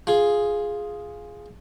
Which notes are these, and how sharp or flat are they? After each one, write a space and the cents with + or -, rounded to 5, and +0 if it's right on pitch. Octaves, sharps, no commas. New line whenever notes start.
F4 +0 G#4 +0